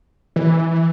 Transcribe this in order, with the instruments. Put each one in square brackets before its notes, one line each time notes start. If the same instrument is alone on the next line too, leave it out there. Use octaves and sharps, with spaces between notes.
[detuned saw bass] E3